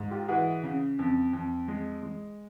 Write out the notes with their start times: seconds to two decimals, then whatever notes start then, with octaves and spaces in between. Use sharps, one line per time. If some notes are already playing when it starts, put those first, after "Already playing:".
Already playing: G#2
0.11 F4 G4
0.28 E3 F#4 G#4
0.63 C#3
0.99 F2
1.33 F2
1.68 G#3
2.03 G#3